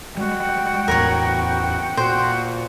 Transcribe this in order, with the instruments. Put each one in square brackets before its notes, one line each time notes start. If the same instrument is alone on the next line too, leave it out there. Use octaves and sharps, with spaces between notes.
[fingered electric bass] G3 G#3 [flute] F#4 [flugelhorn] G5
[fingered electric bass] E2 A2 [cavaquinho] A#4 B4 C#5
[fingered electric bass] A#2 [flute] F#4 [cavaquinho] C5